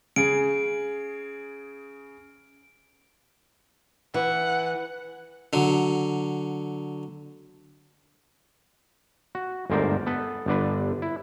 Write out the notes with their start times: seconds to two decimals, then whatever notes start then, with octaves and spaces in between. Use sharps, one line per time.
0.16 C#3 G#4 D7
4.14 E3 F#5
5.53 D3 F#3
9.35 F#4
9.70 G1 D2 G#2 A#4 C5 D5
10.06 B3 A4 B4
10.46 G1 D3 D4 B4
11.02 E4